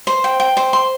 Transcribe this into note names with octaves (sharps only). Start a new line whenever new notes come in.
C5
G5
G5
C5
C6